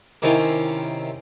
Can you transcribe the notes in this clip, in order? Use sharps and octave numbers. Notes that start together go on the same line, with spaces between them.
C3 D#3 C#4 E4 F4 C5